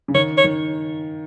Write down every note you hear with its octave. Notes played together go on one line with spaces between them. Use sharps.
C#3
D#3 C#5
C#5
D#3